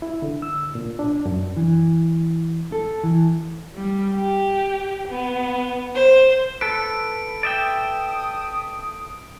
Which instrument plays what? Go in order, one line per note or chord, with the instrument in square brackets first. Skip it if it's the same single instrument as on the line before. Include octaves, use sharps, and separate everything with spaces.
[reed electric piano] E4
D3
E6
A#2
D4
F#2
[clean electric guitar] E3
A4
E3
[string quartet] G3
G4
B3
C5
[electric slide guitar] A4 B4 [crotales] D7
[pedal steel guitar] D5 E5 G5 [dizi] D#6